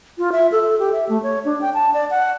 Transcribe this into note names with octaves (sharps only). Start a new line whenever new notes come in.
F4
E5
A4
G4
E5
A3
C#5
D4
G5
A5
D5
F#5